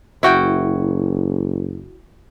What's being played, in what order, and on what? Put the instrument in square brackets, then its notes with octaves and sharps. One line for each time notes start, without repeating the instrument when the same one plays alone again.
[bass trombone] F#1 [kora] E4 F#4 G5